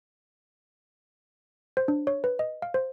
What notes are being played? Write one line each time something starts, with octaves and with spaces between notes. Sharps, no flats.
C5
D4
C#5
B4
D#5
F5
C5